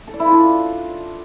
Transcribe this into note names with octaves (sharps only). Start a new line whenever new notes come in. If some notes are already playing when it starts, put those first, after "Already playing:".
A4
D5
E4
F4
D4